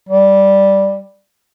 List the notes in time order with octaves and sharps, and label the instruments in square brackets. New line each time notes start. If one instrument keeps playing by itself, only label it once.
[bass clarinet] G3